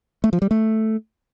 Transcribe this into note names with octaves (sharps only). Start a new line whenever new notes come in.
A3
F3
G3
A3